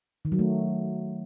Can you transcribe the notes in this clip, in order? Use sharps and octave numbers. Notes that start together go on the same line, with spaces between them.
D#3
F#3
A3